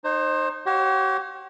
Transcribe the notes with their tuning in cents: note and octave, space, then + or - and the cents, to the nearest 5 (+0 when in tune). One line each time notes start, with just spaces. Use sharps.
D#4 -25 C5 +25
G4 -45 C#5 -35 F#5 -40